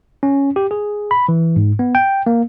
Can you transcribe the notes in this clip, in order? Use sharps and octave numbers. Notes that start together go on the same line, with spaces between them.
C#4
G4
G#4
B5
E3
G#2
B3
G5
A#3